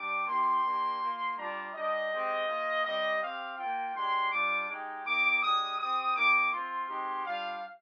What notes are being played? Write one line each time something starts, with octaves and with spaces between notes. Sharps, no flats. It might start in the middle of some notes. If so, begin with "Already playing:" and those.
Already playing: G3 D4 G4 D6
A#3 D#4 G4 C6
A#3 D4 G4
A#3 F4
G3 D4 F4 A#5
G3 D4 G4 D#5
G#3 C4 G4
A#3 F4
G3 C4 G4 D#5
C4 G4 F5
A#3 F4 G5
G#3 D4 G4 C6
G3 D4 F4 D6
G#3 D#4 G4
A#3 D#4 G4 D6
G#3 D4 G4 D#6
C4 G4 D#6
A#3 D#4 G4 D6
C4 F4 C6
G#3 C4 D#4 G4
G3 D4 F4 F5